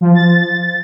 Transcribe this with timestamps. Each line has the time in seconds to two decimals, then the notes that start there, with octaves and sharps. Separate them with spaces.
0.01 F3
0.15 A6